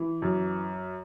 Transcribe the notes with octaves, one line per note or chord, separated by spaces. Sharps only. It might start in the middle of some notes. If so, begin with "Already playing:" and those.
Already playing: E3
F#2